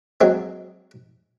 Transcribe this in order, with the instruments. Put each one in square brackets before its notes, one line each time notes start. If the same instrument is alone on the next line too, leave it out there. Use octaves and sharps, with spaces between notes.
[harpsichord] F#3 G#3 C4